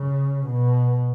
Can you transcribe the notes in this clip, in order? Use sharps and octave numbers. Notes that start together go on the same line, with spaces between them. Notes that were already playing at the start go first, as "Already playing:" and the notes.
Already playing: C#3
B2